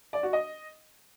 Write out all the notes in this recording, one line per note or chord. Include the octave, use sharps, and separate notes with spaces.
D5
F#4
D#5